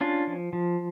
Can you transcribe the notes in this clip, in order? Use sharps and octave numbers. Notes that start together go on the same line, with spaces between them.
C#4 D4 F4
F3
F3